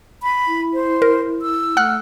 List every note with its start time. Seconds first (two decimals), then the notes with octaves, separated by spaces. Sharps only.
0.23 B5
0.47 E4
0.74 C5
1.02 A#4
1.42 E6
1.77 A3 F#5 F6 F#6